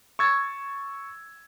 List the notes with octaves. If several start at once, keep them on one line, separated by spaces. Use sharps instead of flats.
C#6 E6 G#6 A6